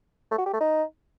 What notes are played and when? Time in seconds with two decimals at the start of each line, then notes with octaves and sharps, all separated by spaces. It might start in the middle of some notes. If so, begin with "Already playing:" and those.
0.31 A3
0.38 F#4
0.46 G4
0.53 A3
0.61 D#4